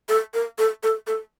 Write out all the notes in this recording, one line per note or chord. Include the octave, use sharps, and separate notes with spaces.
A4
A#4
A4
A4
A4